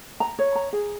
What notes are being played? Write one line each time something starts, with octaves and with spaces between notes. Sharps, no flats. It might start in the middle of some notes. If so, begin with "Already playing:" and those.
A#5
C#5
A#5
G#4